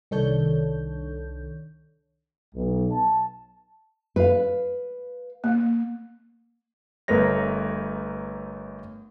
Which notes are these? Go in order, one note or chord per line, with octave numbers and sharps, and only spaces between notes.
C2 D#3 D4 A4 C#5 G6
B1
A5
B4 F5
A#3
G1 A3 A#4 B4 C#5 A#6